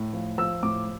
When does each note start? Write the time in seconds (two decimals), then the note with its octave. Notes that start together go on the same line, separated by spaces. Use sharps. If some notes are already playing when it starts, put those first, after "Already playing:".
Already playing: A2
0.13 F3
0.38 F3 E6
0.63 A2 D6